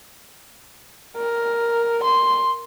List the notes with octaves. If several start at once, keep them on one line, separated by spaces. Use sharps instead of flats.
A#4
C6